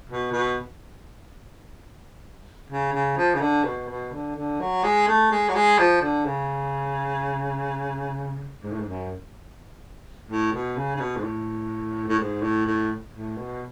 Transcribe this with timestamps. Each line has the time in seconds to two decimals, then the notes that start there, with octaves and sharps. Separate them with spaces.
0.10 B2
0.33 B2
2.70 C#3
2.94 C#3
3.17 F3
3.35 C#3
3.41 D3
3.65 B2
3.89 B2
4.13 D3
4.36 D3
4.61 F#3
4.84 G#3
5.08 A3
5.32 G#3
5.49 F#3
5.56 G#3
5.79 F3
6.02 D3
6.26 C#3
8.63 G#2
8.72 A2
8.80 G#2
8.87 F#2
10.30 A2
10.53 B2
10.77 C#3
10.96 C#3
11.01 B2
11.17 G#2
11.24 A2
12.08 A2
12.20 G#2
12.43 A2
12.66 A2
13.14 A2
13.37 B2